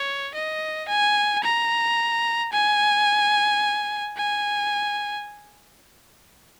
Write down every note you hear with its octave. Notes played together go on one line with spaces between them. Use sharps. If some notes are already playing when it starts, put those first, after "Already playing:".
Already playing: C#5
D#5
G#5
A#5
G#5
G#5